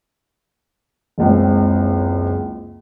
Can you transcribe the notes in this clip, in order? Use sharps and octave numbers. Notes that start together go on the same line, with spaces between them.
F#1 C#2 C4